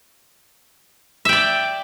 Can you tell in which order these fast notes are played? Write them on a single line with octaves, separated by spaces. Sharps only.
E5 G5 D5